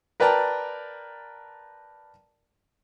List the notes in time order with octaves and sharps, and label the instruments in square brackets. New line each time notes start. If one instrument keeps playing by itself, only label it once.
[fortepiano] A#4 B4 D5 G5 A5 A#5